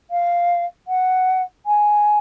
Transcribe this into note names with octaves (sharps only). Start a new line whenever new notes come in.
F5
F#5
G#5